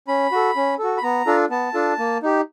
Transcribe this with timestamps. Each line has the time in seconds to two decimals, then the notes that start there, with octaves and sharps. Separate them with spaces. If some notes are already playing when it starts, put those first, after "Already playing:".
0.08 C#4 B5
0.32 F#4 A4
0.56 C#4
0.79 F#4 A4
0.97 B5
1.03 B3 A#5
1.26 D4 F4 A4
1.50 B3 A5
1.74 D4 F4 A4
1.99 A#3
2.22 D#4 G4